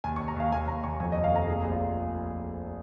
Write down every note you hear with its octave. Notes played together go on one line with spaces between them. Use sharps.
D#2 G#5
C#6
D#2
A#5
D#2 F5
D#2 G#5
D#2 A#5
D#2 C#6
F2 G#5
D#5
F1
F5
F1 A#5
A#2 G#4
G#4
A#1
F4